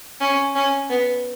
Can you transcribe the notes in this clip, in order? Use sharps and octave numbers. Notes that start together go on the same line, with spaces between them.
C#4
C#4
B3